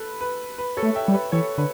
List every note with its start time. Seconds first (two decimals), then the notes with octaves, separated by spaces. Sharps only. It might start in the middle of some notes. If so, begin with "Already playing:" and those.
Already playing: A4 B4
0.21 B4
0.58 B4
0.77 A4 C#5
0.83 A3
0.95 E5 G5
1.08 G3
1.14 B4
1.32 E3 A4 C#5
1.58 D3 B4